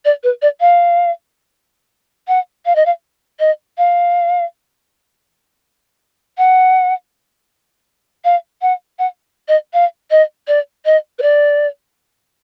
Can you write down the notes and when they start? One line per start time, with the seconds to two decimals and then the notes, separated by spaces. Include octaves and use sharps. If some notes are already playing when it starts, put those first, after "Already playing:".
0.05 D5
0.23 B4
0.42 D5
0.60 F5
2.28 F#5
2.66 F5
2.75 D#5
2.86 F5
3.39 D#5
3.78 F5
6.38 F#5
8.24 F5
8.62 F#5
8.99 F#5
9.48 D#5
9.73 F5
10.11 D#5
10.48 D5
10.85 D#5
11.19 B4
11.22 D5